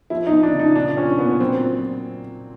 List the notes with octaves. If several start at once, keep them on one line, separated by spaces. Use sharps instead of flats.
F3 E4
D#4
F3
D4
C#3
D#4
A#2 D4
F3 C#4
A#2 B3
F#3 C4